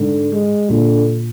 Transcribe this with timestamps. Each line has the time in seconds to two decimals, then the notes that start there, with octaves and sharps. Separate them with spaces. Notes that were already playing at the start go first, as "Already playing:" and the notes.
Already playing: G#2 D3
0.32 G#3
0.70 A#2 D3